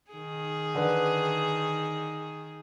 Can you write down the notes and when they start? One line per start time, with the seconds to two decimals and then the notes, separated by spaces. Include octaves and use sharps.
0.11 D#3 G#4
0.75 D3 B4